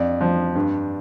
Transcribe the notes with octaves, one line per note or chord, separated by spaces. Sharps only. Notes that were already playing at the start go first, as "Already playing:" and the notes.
Already playing: F2 D5
F3
G2